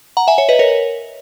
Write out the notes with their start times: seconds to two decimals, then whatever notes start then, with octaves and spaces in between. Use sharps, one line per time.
0.17 F#5 A#5
0.28 E5 G#5
0.38 C#5 E5
0.49 B4 D#5
0.59 A#4 C#5